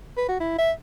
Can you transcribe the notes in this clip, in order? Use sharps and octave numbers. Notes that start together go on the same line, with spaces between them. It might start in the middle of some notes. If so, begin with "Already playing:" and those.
B4
F#4
E4
E5